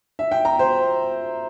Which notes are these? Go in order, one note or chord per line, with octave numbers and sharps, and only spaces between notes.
E5
G5
A#5
C5